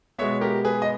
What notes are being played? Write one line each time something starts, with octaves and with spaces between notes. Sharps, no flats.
B2 G#3 B3 C#5 E5
G4 A#4
G#4 B4
D#5